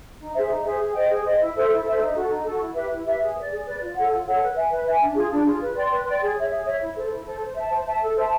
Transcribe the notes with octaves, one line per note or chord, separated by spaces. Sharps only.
D#4
G#4 C5 E5
D#4
G#4 C5 E5
G#4
C5 D#5 G5
G#4
C5 D#5 G5
E4
A4 C5 E5
E4
A4 C5 E5
D#4
F#4 A4
D#4
F#4 A4
E4
G4 B4 E5
E4
G4 B4 E5
G#4
B4 D5
G#4
B4 D5
F4
A4 C#5 F#5
F4
A4 C#5 F#5
B4
E5 G#5
B4
E5 G#5
D4
F4 G#4
D4
F4 G#4
B4
D5 G5 C6
B4
D5 G5 C6
G#4
C#5 E5
G#4
C#5 E5
E4
A4 C5
E4
A4 C5
C5
E5 A5
C5
E5 A5
A4
C5 E5 A5